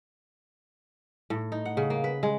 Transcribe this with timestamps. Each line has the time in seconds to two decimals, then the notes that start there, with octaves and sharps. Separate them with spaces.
1.30 A2
1.52 D#4
1.65 F#5
1.77 C#3
1.90 A#3
2.04 B4
2.23 G#3